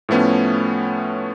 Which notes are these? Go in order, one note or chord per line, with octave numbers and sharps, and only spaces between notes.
A2 F3 A3 B3 C#4